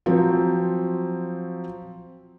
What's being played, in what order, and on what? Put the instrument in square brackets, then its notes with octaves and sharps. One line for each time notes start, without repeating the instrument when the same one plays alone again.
[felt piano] F3 F#3 C4